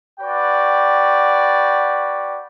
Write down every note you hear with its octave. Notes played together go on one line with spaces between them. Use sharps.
F#4 B4 D5 G5